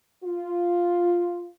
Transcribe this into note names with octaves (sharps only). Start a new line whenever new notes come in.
F4